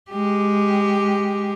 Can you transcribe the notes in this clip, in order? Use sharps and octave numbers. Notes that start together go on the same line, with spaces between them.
G#3 G4